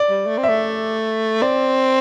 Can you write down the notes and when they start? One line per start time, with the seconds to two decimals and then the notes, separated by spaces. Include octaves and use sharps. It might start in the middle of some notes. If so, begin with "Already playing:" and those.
Already playing: D5
0.10 G3
0.26 A3
0.38 C4
0.43 E5
0.49 A3
1.42 C4 D5